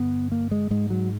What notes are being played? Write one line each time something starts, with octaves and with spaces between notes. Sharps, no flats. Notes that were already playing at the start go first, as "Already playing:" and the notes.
Already playing: G2 D3 B3
A#3
G#3
G#2 G#3
F#3